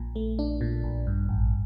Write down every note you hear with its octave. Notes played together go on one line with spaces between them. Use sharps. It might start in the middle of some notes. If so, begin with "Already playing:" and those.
Already playing: A#1 A#2
A3
D4
A#2
A#1
G2
A1